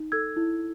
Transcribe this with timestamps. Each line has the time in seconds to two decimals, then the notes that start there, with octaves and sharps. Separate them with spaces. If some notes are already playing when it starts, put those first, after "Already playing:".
Already playing: D#4
0.12 A4 E6 G#6
0.36 E4